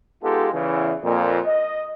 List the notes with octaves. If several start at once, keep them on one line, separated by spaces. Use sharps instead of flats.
G#3 B3 D#4 F4 G4 A4
E2 C#3 E3
F2 A#2
D#5